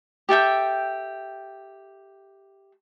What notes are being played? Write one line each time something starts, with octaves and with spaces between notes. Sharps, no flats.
G4 A4 E5 G5